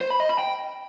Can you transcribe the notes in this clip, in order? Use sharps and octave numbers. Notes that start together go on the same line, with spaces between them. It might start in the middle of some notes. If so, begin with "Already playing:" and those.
C5
B5
D#5
B5
G5